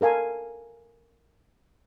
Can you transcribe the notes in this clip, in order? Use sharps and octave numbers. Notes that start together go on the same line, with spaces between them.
A4 A#4 F5 G#5 A5